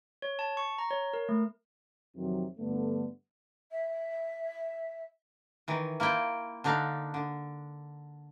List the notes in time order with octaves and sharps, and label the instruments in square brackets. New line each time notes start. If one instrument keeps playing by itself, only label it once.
[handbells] C#5
A5
C#6
A#5
C#5
A#4
A3
[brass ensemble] F2 C3 D#3 F#3
G2 D3 A3 B3
[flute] E5
[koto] D#3 E3
A#3 E4 F4 G5
D3 D4 D#4 F5
D3